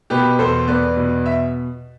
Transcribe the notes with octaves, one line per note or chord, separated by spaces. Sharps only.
B2 G4 B4
E2 A4 C5
E2 B4 D5
B2
E5